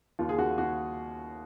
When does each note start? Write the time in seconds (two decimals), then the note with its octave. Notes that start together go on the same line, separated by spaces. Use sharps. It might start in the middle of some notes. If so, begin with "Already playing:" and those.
0.19 D#2 F4
0.29 G#4
0.38 D#2 F#4
0.58 D#2 F#4